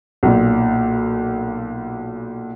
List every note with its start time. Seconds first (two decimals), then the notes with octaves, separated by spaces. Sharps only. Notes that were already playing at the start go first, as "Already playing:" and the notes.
0.23 B1 A#2